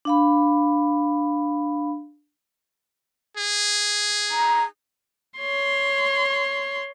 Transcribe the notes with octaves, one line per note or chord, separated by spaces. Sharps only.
D4 F5 B5
G#4
A#5
C#5 C6